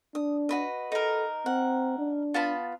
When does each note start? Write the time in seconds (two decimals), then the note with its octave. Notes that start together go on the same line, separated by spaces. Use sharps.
0.15 D4 D#6
0.49 F#4 B4 D#5
0.92 D#4 A4 A#4
1.46 C4 F#5
1.98 D4
2.34 B3 F4 A5 B5